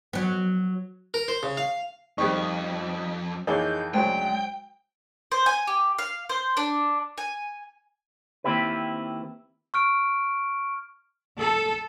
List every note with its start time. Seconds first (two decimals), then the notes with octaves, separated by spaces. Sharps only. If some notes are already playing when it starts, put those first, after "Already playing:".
0.13 F#3 B3
1.14 A#4
1.28 C5
1.43 C#3
1.57 F5
2.18 F2 D#3 G3 C4 D#4 C#6
3.47 F2 E3 A#3 D#4 G#4 C#5 G6
3.94 D2 C#3 F#3 G#3 C5 G5 G#5
5.32 C5
5.46 G#5
5.67 G4
5.99 F5
6.29 C5
6.57 D4
7.18 G#5
8.44 D#3 A#3 C4 E4 G4 B4
9.74 C#6 F6 D7
11.38 A4